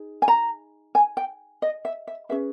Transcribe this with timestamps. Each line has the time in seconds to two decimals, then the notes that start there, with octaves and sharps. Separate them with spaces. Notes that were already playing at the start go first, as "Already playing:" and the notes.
Already playing: D#4 G#4
0.22 G#5
0.28 A#5
0.95 G#5
1.17 G5
1.62 D#5
1.85 E5
2.07 E5
2.29 C#4 G#4 B4 E5